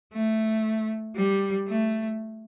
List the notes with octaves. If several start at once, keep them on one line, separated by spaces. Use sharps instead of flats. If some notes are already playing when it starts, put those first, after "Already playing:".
A3
G3
A3